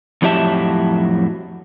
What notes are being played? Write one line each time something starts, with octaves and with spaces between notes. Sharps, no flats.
F2 A2 F#3 G4 E5 A5